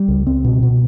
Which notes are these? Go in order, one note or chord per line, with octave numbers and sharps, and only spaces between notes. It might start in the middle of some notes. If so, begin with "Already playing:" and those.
Already playing: G3
C#2
C4
B2
B2